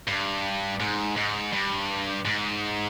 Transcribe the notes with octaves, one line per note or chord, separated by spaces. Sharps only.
G2
G#2
G#2
G2
G#2